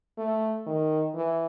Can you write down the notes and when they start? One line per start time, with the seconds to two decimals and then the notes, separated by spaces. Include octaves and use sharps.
0.18 A3
0.67 D#3
1.15 E3